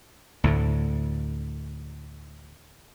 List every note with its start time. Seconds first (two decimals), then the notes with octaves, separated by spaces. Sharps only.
0.44 D2 A2 D3